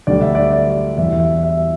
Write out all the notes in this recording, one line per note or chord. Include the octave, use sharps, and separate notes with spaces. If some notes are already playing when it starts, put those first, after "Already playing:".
D2 D3 G3 D5
E5
D5
D5
E2 E3 G3 E5
E5
E5